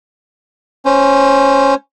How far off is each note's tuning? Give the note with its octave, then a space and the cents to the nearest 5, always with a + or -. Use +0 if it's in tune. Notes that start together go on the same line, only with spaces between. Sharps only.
C#4 -5 C5 +5